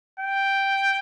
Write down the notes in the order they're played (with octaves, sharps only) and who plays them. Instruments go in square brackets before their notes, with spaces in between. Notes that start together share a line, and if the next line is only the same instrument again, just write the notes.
[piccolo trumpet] G5